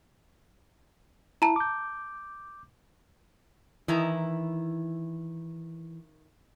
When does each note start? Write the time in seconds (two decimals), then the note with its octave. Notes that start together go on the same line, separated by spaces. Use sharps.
1.42 E4 A5 A#5
1.56 D6 G6
3.88 D#3 E3 E4 A#5